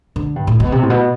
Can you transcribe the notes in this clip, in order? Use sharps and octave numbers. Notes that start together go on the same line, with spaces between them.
D3
G2
A2
B2
C3
A2
B2